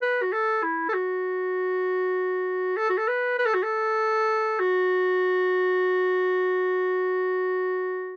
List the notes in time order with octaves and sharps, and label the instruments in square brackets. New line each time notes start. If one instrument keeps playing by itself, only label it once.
[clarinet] B4
F#4
A4
E4
A4
F#4
A4
F#4
A4
B4
B4
A4
F#4
A4
F#4